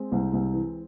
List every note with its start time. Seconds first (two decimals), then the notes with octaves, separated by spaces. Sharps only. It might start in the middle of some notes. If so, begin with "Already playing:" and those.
Already playing: G#3 C4
0.12 C2
0.33 C2
0.53 E3